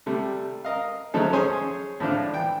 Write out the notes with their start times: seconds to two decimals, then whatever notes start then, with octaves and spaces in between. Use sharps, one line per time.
0.06 C3 G3 A3
0.64 A#4 D#5 F5
1.14 C#3 F3 F#3 A3 D#4 A4
1.33 C#4 G#4 C5 C#5 G#5 C6
2.00 A2 F3 D4 F4
2.33 E3 G5